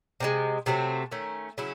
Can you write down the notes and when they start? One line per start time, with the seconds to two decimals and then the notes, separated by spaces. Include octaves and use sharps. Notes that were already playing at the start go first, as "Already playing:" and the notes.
0.20 C3 D#3 G#3
0.66 C3 F#3 A3 C4
1.12 D#3 A3 C#4
1.58 C#3 F#3 C#4 E4